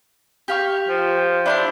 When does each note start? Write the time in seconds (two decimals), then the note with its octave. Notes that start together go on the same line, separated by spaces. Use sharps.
0.48 G4 F5 C#6
0.88 F3
1.46 D4 E4 C5 C6